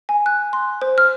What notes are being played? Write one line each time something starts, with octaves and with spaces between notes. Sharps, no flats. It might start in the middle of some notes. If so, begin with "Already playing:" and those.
G#5
F#6
C6
C5
F6